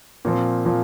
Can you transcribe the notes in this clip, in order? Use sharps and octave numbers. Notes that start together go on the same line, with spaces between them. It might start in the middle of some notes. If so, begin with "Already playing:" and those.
A#2 F3 C4
A#2 F3 C4